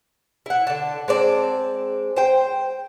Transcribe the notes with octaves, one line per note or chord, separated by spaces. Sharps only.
E4 F#5
D3 A5
G#3 C4 D5 A5
C5 G5